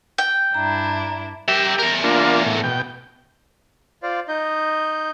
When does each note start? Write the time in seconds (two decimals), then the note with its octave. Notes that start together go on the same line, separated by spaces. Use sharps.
0.18 G5
0.54 G2 D4 E4 A#5
1.48 G4 A#4 E5
1.79 E2 A#4
2.04 A#3 D4 F4
2.46 A2
2.64 B2 G5
4.03 F4 C5 D5 F5
4.28 D#4 D#5 G6